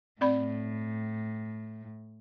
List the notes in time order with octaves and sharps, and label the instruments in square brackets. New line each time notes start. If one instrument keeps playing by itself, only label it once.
[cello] A2 [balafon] C4 D5 B5